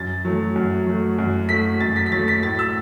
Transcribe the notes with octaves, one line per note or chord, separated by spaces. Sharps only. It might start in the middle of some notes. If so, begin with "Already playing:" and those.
Already playing: F#2 A6
F#3 A3
F#2
F#3 A3
F#2
F#3 A3 B6
F#2 A6
B6
B6
F#3 A3 A6
B6
A2 A6
E6